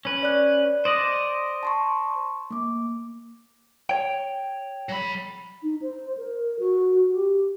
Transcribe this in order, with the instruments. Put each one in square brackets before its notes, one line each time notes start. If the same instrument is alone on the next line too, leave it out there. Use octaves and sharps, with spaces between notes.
[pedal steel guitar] C#4 B4
[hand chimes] D5 F#6
[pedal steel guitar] C5 D5 D#5 [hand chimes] D#6
[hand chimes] A5 C6 C#6
A#3 D6
[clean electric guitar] C#5 G5
[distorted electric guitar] F#3 B5
[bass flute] D#4
C5
A#4
F#4
G4